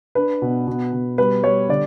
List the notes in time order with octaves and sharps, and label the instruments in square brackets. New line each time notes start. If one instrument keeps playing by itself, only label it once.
[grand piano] D4 B4
B2
B2
B2
G3 B4
G3 C#5
D3 D5